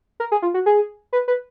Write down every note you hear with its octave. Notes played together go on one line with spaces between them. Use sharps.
A#4
G#4
F4
F#4
G#4
B4
B4